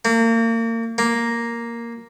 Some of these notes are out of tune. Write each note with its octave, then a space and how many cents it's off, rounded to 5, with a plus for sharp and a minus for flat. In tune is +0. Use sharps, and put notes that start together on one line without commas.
A#3 -35
A#3 +0